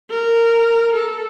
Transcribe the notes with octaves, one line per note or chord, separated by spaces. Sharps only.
A#4
A4